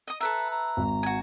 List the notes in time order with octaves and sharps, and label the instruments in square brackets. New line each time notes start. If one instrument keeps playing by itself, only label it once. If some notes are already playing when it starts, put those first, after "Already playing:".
[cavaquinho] D#5 D#6
[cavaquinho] A4 B4 E5 [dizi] A#5
[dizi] A#5
[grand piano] G#1
[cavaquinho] F#4 G#5